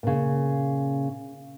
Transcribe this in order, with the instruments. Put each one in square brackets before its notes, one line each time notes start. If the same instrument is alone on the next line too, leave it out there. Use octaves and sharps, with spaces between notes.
[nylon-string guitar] A#2 C#3